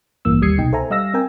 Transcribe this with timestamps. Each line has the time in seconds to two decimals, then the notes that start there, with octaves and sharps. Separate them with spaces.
0.25 A1 G2 E3 A#3 E6
0.42 D#2 G3 D#6 G#6 C7 C#7
0.58 C2 B2 D#4 G5
0.73 A4 C5 E5 G#5 A#5
0.90 G3 D#5 F5 E6 A#6
1.14 C4 A#4 G5 G#5